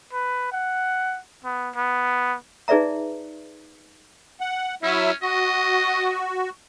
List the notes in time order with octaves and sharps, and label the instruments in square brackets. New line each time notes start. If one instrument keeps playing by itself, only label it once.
[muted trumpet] B4
F#5
B3
B3
[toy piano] D#4 G#4 B4 D5 E5 A#5
[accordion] F#5
[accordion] F#3 E4 E5 [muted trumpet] C#4
[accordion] F#4 [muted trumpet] D#5